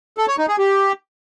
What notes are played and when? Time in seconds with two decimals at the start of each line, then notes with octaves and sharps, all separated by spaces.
0.18 A4
0.28 C#5
0.38 D#4
0.48 G#4
0.58 G4